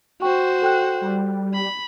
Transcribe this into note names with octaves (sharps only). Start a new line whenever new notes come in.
F#4 C5 G5 C#6
A4 G5 F#6
G3
B5